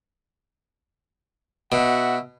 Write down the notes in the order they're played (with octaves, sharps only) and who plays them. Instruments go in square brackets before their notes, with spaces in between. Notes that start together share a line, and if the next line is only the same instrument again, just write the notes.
[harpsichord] B2 [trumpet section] F#4 E5 F#5